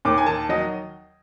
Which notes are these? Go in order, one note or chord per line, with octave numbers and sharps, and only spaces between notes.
D#2 D6
G#5
D#3 A5
F#3 D#5